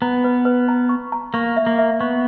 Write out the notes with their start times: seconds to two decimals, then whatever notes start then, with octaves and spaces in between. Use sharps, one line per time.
0.02 B3 A#5
0.24 B4
0.45 B4
0.68 A#5
0.89 C#6
1.12 A#5
1.34 A#3 C#6
1.57 E5
1.67 A#3
1.79 E5
2.01 B3 C#6